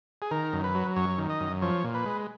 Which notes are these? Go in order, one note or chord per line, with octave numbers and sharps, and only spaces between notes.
G#4
D#3 A#4
F#2
B4
F#3
F#2 C#5
D#3
D#5
F#2
F3 C#5
A#2
B4
G#3